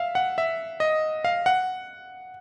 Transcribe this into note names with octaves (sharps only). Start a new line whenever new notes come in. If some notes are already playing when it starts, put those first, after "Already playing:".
Already playing: E5 F5
F#5
E5
D#5
F5
F#5